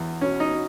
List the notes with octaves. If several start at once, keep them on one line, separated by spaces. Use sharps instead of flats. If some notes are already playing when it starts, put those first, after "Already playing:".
Already playing: E2
B2 C#4
D#4
B2